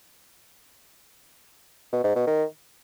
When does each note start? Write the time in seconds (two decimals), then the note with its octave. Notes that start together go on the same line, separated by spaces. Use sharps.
1.92 B2
2.04 G#2
2.16 B2
2.27 D#3